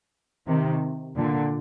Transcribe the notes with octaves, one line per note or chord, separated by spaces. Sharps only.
C3 D#3
A#2 D3